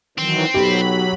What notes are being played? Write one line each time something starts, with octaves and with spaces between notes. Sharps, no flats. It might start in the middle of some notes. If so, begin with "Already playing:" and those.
D#3 E3 F#3 C4
B1 F#3 G4 B5